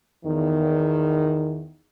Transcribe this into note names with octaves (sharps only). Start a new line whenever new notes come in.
E2 D#3